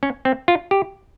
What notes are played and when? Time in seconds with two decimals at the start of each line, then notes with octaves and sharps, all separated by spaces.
0.03 C#4
0.25 C4
0.48 F4
0.71 G4